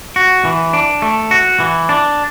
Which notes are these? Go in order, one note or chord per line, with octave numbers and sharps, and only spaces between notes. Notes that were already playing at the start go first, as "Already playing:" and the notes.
F#4
E3
D4
A3
F#4
E3
D4